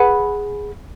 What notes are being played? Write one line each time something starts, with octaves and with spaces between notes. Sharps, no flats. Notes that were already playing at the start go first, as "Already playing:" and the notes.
Already playing: G#4 B4 F#5 B5